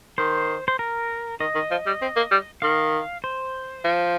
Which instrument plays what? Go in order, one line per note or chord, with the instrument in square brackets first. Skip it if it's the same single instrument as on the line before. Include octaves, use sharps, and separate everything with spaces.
[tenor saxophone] D#3 [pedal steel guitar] C5
[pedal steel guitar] C5
A#4
[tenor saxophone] D#3 [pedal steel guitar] D#5
[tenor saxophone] D#3
F3
G3
C4
A#3
G3
[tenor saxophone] D#3 [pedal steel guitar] F5
[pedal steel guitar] C5
[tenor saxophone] F3